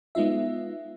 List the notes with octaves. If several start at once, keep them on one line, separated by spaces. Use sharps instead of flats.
G#3 B3 D#4 F4 E5